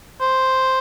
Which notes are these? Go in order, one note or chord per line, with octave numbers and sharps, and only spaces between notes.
C5